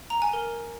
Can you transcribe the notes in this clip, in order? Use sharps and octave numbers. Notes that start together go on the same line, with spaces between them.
A#5
G#5
A#4